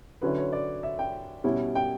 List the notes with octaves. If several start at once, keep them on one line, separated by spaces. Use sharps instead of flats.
D3 F#3 C#4 E4 B4
C#5
D5
E5
G5
B2 G3 C#4 E4
G5